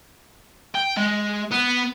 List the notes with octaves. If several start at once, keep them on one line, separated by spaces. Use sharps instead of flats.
G5
G#3
B3